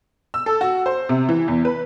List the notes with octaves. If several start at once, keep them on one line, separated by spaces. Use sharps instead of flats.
E6
A4
F#4
C5
C3
E3
E2
B4